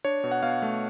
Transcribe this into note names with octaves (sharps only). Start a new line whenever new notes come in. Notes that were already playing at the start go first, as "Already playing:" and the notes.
D4 C#5
B2
F#5
B2 F5
A3